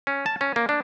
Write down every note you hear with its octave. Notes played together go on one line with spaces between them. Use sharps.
C#4
A5
C#4
A#3
D4